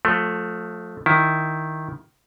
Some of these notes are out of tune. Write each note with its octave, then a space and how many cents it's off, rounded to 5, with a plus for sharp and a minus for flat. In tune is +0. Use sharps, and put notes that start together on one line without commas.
F3 +35 A3 +0
D#3 +0 E4 +0